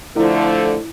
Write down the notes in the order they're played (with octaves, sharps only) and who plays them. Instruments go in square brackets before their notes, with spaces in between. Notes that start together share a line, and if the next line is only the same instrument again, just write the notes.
[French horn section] D3 F3 A3 [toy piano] E4